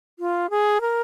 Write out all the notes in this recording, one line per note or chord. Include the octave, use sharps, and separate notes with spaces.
F4
G#4
A#4